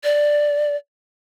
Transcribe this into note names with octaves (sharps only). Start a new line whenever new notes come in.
D5